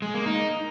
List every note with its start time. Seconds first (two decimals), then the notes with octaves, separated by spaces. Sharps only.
0.02 G#3
0.14 A#3
0.26 D#4